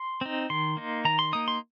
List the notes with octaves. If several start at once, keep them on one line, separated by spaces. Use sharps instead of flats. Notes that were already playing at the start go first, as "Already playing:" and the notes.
Already playing: C6
C4 D#4
D#3 C6
A#3 D#4
D#3 A#5
C6
A#3 D#4 D#6
C6